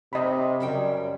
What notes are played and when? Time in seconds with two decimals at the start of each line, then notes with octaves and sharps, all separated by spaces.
0.13 C3 D#5 B5
0.60 F#2 C#3 G3 G5